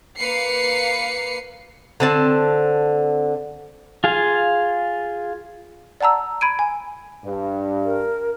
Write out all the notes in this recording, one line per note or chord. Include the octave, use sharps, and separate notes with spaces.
A#3 B4 F5 C7 C#7
D3 C4 A5
F4 G#4 F5
D5 F#5 A5 A#5 E6
B5 G#6 D7 D#7
G#5
G2
A#4